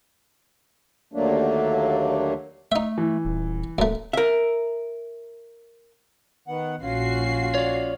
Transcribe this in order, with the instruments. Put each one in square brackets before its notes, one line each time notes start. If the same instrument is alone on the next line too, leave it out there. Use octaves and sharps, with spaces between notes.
[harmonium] D#2 D3 F#3 A3 A#3 D4
[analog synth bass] A3 [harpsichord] D#4 E5
[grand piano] E3
[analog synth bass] D#1
[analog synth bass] D1 [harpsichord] F#2 A3
[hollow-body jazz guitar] A#4 E5
[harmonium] D#3 B3 F#5
[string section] A#1 F#4 C7 [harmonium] C#4 F4
[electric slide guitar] C#5 D5